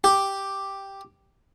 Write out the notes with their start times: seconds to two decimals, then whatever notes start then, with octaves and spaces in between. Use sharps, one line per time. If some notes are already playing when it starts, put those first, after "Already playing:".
0.04 G4